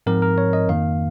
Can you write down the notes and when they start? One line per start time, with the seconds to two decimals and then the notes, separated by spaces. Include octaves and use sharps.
0.06 G#2 F3 C4 A#4
0.22 A#4
0.38 C#5
0.53 D#5
0.68 F2 D#3 A#3 F5